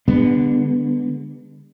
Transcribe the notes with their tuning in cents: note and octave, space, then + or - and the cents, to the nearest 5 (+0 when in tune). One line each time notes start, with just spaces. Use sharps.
D3 +0 G3 +45 B3 +0